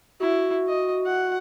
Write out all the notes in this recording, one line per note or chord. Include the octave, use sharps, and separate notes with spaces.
E4 F#4
D#5
F#5